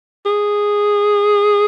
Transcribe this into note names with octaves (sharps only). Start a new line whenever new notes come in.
G#4